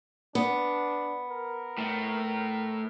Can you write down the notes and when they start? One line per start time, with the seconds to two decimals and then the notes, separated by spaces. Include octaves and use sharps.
0.35 B3 D4
1.30 A#4
1.78 A2